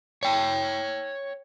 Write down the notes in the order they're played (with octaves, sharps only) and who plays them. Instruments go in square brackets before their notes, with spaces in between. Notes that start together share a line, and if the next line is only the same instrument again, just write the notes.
[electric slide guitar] C#5 G5